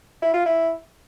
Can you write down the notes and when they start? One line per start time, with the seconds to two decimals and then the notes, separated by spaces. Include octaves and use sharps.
0.22 E4
0.34 F4
0.45 E4